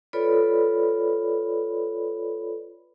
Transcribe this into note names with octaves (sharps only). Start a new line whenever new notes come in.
F4 A4 B4 C#5 D5 B5